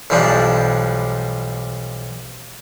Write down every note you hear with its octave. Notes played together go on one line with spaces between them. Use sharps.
B1 E3 F3 G3 D4